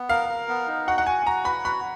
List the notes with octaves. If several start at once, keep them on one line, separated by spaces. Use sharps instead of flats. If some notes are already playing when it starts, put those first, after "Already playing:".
Already playing: B3
A#4 F5
A#4
B3
D#4
F#4 F#5
F#5
F#4 G#5
F#4 A#5
B4 B5
F#4 B5